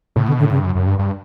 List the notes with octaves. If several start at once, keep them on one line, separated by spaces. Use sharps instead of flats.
A2 C#3
B2 D3
A2 D3
G2 C#3
F#2
F#2
G2
G2